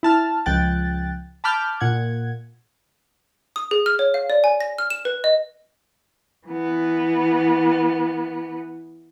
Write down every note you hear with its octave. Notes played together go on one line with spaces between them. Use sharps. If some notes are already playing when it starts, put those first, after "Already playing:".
E4 A5 F6
C#2 F3 G5 F#6 A6
A5 B5 D6 F6 G6
A#2 F#5 G#6
D#6
G#4
F6
C#5
F5
D5
G#5
A#6
F6
E7
B4
D#5
E3 B3